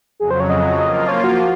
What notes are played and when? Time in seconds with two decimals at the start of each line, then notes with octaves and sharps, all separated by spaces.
0.20 F2 C#3 F#3 G#4
0.31 C5
0.40 C#5
0.50 D#5
0.79 F3 A#3 F4 D#5
0.94 D#5
1.08 C#5
1.24 F#4